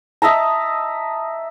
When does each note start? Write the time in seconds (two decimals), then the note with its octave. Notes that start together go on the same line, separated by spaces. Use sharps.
0.22 D#5 E5 A5 A#5